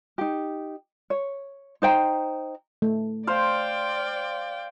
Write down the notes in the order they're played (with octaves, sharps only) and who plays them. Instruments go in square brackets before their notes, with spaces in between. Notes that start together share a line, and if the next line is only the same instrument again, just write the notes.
[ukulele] D#4 G4
C#5
D#4 C5 G5 A#5
[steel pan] A3
[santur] C5 F5 [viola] D5 G5